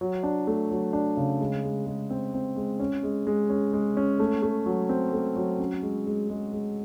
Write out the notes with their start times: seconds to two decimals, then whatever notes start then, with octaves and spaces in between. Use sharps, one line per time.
0.01 F#3
0.23 D4
0.47 A3
0.71 F#3
0.93 D4
1.17 C#3
1.40 G#3
1.64 G#3
1.86 G#3
2.10 C4
2.34 C4
2.56 G#3
2.79 C#4
3.03 G#3
3.27 G#3
3.50 C#4
3.73 G#3
3.97 C#4
4.19 A3
4.42 A3
4.66 F#3
4.89 C4
5.13 A3
5.36 F#3
5.59 C#4
5.82 G#3
6.07 G#3
6.30 G#3
6.53 G#3